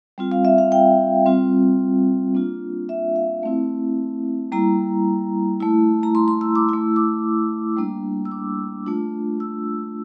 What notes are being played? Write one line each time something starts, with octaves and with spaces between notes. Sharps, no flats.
G3 C4 F4
F5
E5
F5
G5
G3 C4 F4
A#3 D4 F4
E5
F5
A3 C4 E4
G3 A#3 E4 A#5
A3 E4
A#5
C6
C6
E6
D6
A3 E4 E6
D6
G3 A#3 D4
E6
D6
A3 D4 F4
E6